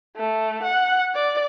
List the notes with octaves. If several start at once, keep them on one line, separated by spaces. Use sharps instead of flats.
A3
F#5
D5